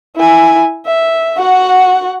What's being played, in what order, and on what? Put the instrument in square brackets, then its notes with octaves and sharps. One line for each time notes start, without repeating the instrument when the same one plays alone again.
[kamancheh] E4 G#5
E5
F#4 F#5